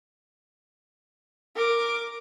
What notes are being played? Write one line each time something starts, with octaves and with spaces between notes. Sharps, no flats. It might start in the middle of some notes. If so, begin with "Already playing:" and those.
A#4 D6